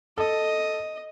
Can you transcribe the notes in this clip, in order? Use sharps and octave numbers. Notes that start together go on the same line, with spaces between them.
A4 D#5